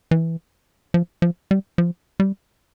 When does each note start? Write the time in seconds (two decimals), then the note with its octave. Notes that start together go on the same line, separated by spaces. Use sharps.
0.11 E3
0.94 F3
1.22 F3
1.51 G3
1.78 F3
2.20 G3